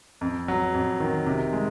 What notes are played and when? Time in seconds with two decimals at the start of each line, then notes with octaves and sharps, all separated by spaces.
0.21 F2
0.48 F#3
0.74 F2
1.00 D#3
1.26 C3
1.53 G#3